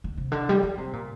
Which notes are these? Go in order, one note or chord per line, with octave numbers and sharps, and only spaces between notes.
D3
C3
D3
G3
F3
C3
A#2